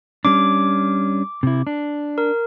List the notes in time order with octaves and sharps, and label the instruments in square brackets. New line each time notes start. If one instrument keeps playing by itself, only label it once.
[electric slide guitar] G3 C#4 D4 [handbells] D6
[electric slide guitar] C3 E4
D4
[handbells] A#4